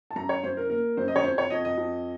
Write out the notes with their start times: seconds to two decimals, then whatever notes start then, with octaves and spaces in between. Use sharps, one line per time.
0.11 A5
0.16 F#2 A#5
0.29 C#5
0.43 F#2 C5
0.57 A#4
0.70 A#3 A#4
0.97 F#2 C5
1.08 D#5
1.16 C#5
1.23 F2 C5
1.38 C#5
1.50 F2 D#5
1.65 D#5
1.78 F2